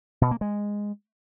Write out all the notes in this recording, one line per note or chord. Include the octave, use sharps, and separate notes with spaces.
B2
A#3
G#3